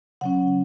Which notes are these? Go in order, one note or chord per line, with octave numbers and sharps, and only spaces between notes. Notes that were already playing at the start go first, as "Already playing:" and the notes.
C#3 F#3 C#4 F#5